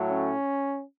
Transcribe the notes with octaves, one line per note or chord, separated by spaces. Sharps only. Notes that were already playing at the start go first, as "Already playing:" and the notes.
Already playing: A2 F#3 A3
C#4